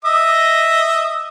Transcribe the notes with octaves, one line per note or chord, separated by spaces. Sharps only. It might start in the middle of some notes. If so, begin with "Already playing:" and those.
D#5 E5 D#6